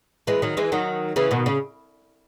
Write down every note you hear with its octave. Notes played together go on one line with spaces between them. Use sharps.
E3 G#3
D#3 F#3
E3 G#3
D#3 F#3
C#3 E3
B2 D#3
C#3